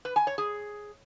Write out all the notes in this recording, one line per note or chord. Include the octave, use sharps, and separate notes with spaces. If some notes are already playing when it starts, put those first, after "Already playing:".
B4
G#5
C#5
G#4